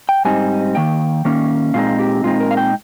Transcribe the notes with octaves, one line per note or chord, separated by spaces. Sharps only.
G5
G#2 G3 C4 D#4 G#5
D#3 A#3 G5
D#3 A#3 C#4
A#2 G#3 C4 D#4 F5
G4
A#2 G#3 C4 D#4 F4
A#4
F5
G5